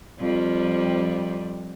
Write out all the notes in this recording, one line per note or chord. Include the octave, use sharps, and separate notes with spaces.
F2 F3 G3